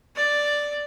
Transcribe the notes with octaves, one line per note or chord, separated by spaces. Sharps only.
D5